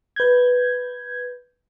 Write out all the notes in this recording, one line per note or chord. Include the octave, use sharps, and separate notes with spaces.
B4 G6 G#6